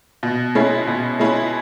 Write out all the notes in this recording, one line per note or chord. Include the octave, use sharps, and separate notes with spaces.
B2
G#3 C#4 E4
B2
G#3 C#4 E4